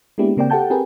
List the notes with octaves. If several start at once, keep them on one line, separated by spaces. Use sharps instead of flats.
G#3 A#3 B3 D4 E4 G4
C#3 A#3 C4 D5 G5
G4 A4 F#5 G5 A5 G6
C4 G4 G#4 A#4 B4